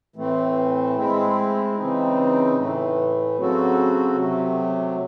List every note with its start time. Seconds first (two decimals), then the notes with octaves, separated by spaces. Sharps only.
0.16 A2 E3 A3 C4
0.96 G#3 C4 E4
1.76 C#3 E3 C4 D#4
2.56 A2 E3 A3
3.36 C#3 F#3 C4 F#4 A4
4.15 C3 F#3 A3